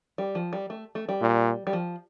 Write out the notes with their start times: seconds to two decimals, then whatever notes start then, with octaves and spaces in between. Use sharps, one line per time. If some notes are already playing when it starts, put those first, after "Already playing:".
0.18 G3
0.35 F3
0.53 G3
0.70 A3
0.95 A3
1.09 G3
1.22 A#2
1.67 G3
1.73 F3